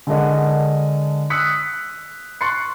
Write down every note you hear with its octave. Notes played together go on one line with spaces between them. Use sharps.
D3 G#3 D4 A#4 D#5 F#5
D#6 E6 F#6 B6 C#7
C6 C#6 F#6 A6 C7 C#7